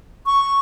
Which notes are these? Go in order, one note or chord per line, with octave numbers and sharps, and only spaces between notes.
C#6